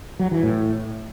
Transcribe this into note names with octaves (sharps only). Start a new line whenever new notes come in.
F#3
E3
A2